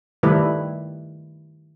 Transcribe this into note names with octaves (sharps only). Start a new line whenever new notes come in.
D#3 G3 A3 E4 B4